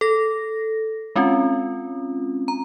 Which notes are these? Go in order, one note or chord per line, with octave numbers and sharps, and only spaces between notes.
A4 A#6
G#3 C4 C#4 F4
A#5